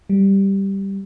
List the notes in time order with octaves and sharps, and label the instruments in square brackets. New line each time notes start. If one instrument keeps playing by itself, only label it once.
[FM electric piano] G3